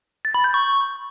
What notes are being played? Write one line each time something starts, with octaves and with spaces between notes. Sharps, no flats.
A6
B5
G6
C#6